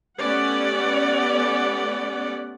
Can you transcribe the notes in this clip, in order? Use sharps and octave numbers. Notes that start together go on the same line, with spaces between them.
A3 B3 C#4 G4 D5 F#5